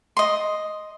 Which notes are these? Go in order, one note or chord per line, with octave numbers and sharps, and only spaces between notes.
D#5 C6